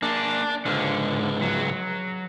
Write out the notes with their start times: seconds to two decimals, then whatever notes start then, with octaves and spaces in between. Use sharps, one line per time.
0.03 A#3 D4 G#4
0.66 C#2 G#2 D3
1.42 F#3